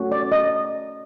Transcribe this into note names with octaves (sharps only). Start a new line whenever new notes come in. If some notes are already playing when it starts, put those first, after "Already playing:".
Already playing: A3 C#4 F#4
D5
D#5